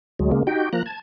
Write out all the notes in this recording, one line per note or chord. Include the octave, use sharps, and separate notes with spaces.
D2 F#3 G#3
C#3 G#3 A#3
D#4 F#4 G4 G5
F3 A#3 A#5 F#6
A5 G#6